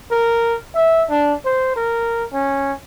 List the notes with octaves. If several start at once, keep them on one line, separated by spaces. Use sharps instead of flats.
A#4
E5
D4
C5
A#4
C#4